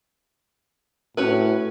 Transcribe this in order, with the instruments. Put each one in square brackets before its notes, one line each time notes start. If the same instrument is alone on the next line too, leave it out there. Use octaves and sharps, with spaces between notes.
[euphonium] A2 [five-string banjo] C#4 F#4 B4